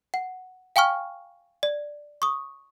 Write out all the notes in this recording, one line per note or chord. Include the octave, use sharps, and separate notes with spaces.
F#5
F5 G5 G#5 C#6 F6
D5
C#6 D#6